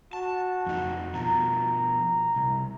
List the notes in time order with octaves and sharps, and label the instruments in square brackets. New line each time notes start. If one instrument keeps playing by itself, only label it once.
[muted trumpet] F#4 [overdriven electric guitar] A5
[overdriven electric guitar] F2 D#4
[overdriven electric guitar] B2 F3 [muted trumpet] A#5
[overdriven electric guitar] C2